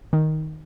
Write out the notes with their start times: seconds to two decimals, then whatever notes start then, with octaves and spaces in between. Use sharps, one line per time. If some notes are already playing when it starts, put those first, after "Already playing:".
0.13 D#3